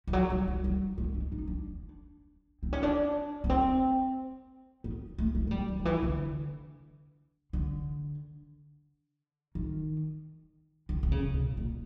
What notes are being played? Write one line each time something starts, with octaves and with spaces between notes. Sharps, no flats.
F3
F#3
G3
G3
G3
G#3
D4
D#4
D4
C4
C#4
D4
B3
C4
B3
A3
G#3
G#3
G3
F#3
D#3
E3
D3
D3
D#3
D3
D3
C#3
B2
A#2